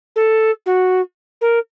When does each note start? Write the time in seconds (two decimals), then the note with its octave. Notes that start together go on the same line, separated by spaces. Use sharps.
0.16 A4
0.66 F#4
1.41 A#4